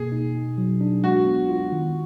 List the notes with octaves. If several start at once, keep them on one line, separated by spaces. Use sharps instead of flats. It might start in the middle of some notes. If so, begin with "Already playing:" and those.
Already playing: B2 A#3 G#4
D#4
B2
F#3
D4
G#3 F#4
B3
F4
D#3